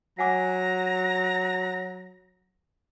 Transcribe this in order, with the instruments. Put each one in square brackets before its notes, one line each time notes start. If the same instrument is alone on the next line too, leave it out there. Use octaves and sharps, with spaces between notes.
[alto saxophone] F#3 [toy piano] F#5 G#5 D6 [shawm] A#5